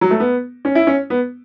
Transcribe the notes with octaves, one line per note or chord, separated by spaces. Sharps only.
F#3
A3
B3
C#4
E4
C#4
B3